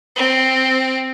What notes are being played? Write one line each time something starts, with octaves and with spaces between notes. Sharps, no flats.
C4